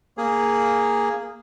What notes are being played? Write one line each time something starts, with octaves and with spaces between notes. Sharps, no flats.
A#3 G#4